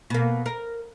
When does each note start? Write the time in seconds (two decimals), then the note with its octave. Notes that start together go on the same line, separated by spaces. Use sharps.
0.10 B2 A#3
0.46 A#4